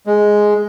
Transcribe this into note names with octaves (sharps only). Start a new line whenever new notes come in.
G#3